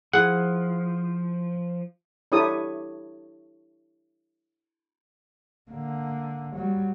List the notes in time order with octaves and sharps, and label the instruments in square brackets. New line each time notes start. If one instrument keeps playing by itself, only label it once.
[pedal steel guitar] F3 [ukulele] E4 G#4 [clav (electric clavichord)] F#5
[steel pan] D4 E4 G4 A4 C#5 D#6
[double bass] D3 A#3
F#3 G3